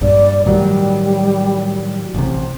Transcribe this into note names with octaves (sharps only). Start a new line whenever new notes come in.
A#1 G2 D5
A2 D#3 F#3 G3
A1 C3